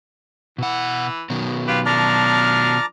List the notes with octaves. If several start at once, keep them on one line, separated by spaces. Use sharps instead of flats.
B2 E3 F#5
B2 D#3 F#3
F4 G4 B4
F3 D4 A5 A#5 D6 F6